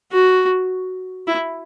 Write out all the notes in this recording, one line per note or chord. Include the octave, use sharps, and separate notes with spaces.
F#4
E4